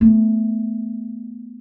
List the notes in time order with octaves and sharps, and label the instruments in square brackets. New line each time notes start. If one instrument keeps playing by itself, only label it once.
[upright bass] A3 B3